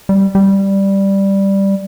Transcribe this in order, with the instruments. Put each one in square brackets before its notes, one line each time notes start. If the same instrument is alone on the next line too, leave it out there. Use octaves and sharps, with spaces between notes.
[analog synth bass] G3
G3